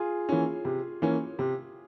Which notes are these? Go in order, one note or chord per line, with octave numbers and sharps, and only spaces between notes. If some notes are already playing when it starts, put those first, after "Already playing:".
Already playing: F4 G#4
E3 A#3 C#4
C3
E3 A#3 C#4
C3